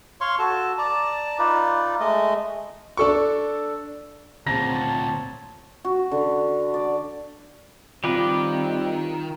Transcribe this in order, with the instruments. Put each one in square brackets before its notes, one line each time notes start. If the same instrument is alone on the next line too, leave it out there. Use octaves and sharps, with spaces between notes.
[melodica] C#5 F5 C6 C#6
F#4 A4 A5
D5 A5 A#5
D#4 F4 B4 D5
G#3 A3 D#5
[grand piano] D4 A4 C#6
[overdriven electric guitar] D2 A#2 [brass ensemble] C4 C#5 [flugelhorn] A5 [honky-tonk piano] A#5 A#6
[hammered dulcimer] F#4
D3
D5
[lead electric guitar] D#3 [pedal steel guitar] G3 G4 B4 [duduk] C4 [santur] F4